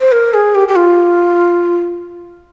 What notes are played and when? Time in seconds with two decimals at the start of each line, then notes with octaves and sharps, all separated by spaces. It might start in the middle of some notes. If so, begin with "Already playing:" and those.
0.01 C5
0.12 A#4
0.34 G#4
0.55 G4
0.68 G4
0.76 F4